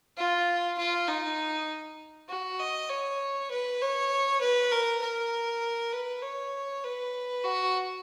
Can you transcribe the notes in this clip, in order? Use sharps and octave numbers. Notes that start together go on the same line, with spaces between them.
F4
F4
D#4
F#4
D#5
C#5
B4
C#5
B4
A#4
A#4
B4
C#5
B4
F#4